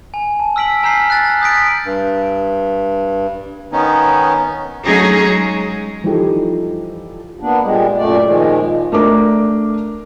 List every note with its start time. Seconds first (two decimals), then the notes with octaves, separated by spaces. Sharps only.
0.14 G#5
0.40 A5
0.56 E6 F6 B6 D7 F#7
0.83 G#5 A#5 F6 G6 B6 C7
1.10 F#6 A6
1.42 D#6 G6 A6 B6 D7
1.85 G2
3.72 D#3 B3 C#4 D#4
4.85 F#3 A3 C#4 D#4 G#4
5.29 G#3
6.04 E3 F3 G3 D#4 G4 A4
7.40 A#3 B3 D4
7.62 A#2 G3 G#3
7.97 F#2 A#2 A3 D5
8.24 A#2 D#3 F3 G#3
8.92 A3 D4 A#4 D6